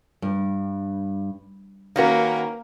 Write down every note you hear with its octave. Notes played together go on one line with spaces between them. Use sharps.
G2
D#3 A#3 C#4 F#4 A#4 B4 F5